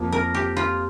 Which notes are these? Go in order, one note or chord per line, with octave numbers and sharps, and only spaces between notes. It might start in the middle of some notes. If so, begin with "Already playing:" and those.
Already playing: F2 F3 A#3
A#4
G4
F4